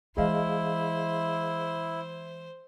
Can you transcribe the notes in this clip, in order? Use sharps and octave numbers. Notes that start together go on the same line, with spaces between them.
E3 G#3 E4 G#4 C5 D#5 F5